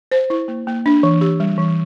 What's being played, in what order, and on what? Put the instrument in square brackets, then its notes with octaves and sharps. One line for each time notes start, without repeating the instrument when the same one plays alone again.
[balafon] C5
E4
A#3
A#3
D4
E3
G4
G3
E3